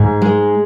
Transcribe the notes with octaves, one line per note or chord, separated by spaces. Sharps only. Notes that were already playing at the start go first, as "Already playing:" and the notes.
Already playing: G#2 G#4
G#3